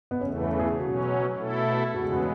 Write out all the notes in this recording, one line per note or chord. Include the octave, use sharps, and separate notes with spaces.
B3
E2 C#3 E3 A3 C#4
B3
G#4
B2 F#3 C#4 F#4
B2 A3 E4 A4
E2 C#3 G#3 B3 F#4
G#4
F#4